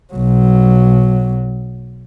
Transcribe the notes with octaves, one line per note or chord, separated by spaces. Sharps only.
B1 F#3